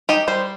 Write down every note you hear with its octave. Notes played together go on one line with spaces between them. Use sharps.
D#4 G4
G3 C5